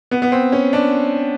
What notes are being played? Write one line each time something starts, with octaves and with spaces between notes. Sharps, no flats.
B3
B3
C4
C#4
D4